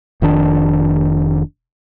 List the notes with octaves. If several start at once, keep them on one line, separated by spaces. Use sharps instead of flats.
F1 D#3 D4